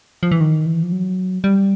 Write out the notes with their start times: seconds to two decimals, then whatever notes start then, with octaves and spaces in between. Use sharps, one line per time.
0.23 F3
0.32 E3
0.41 D#3
0.66 E3
0.83 F3
0.92 F#3
1.44 G3